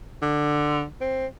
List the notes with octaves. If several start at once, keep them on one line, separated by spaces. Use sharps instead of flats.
D3
C4